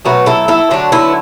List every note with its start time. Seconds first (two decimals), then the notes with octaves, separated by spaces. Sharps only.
0.05 B2 F#3 A3 F#4 B4
0.26 E4 A4
0.48 E4 A4
0.71 D3 F#3 A3 D4 F#4
0.92 B3 E4